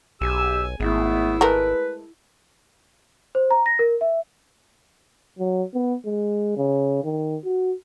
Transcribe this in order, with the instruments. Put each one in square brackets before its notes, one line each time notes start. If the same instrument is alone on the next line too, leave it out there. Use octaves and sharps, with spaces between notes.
[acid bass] B1 [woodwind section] G4 E6 [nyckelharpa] G#5
[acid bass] G#1 [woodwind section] A3 B3 G#4 [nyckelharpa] E4
[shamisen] G#3 A3 A#4 [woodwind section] B4
[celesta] C5
A#5
A#6
A#4
E5
[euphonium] F#3
B3
G#3
C#3
D#3
F#4